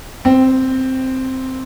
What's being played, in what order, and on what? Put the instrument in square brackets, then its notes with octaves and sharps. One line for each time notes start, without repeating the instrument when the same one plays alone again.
[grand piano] C4